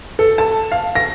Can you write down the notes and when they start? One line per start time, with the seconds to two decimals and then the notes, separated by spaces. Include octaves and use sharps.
0.19 A4
0.38 A5
0.72 F5
0.95 A#6